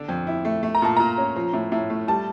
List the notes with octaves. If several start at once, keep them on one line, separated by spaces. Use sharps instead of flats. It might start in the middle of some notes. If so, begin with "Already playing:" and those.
Already playing: D3 D4
F2
E4
A3
A3
A#5
A#2 A5
A#2 A#5
C#4
F3
A2
A2
A3
G3 A5